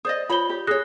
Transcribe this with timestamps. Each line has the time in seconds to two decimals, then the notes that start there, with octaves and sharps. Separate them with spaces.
0.05 C5 D5 D#5 D#6
0.30 F4 C5 C#5 B5 G7
0.50 G4
0.67 G#4 C#5 D#6 F#6 A#6